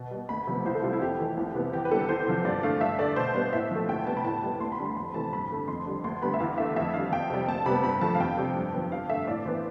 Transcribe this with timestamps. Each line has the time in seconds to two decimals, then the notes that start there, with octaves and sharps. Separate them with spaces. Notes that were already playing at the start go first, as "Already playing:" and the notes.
Already playing: B2
0.11 G3 B3
0.29 D2 B5
0.47 C3 F3 B3
0.65 C2 C5
0.75 A4
0.83 C3 G3 F4
0.93 E4
1.01 F2 G4
1.19 E3 A3
1.37 C2
1.55 C3 E3 B3
1.73 E2 G4
1.85 B4
1.91 D3 G3 B3 A4
2.09 E2 C5
2.27 C3 F3
2.45 G2 D5
2.63 D3 A3 F5
2.81 G2 E5
2.99 D3 A3 D5
3.16 B2 C5
3.35 G3 B3
3.53 A2 E5
3.71 F3 A3
3.88 D2 G5
4.06 C3 G3 B3 A5
4.17 B5
4.24 A2 A5
4.43 G3 B3
4.60 D2 C6
4.72 B5
4.79 D3 G3
4.85 C6
4.96 F2 B5
5.14 C3 E3 A3 A5
5.33 G2 B5
5.51 D3 A3
5.68 F2 C6
5.86 D3 G3
6.04 D2 C6
6.22 D3 G3 B3 B5
6.34 E5
6.40 E2 F5
6.58 D3 A3 E5
6.76 F2 E5
6.94 D3 G3 F5
7.12 F2 G5
7.30 C3 G3
7.48 D2 A5
7.66 C3 G3 B3 B5
7.84 G2 B5
8.01 F3 A3 A5
8.15 F5
8.20 F2 G5
8.37 C3 G3
8.56 G2
8.74 F3 B3
8.92 G2 F5
9.10 D3 A3 E5
9.27 A2 D5
9.45 E3 B3 C5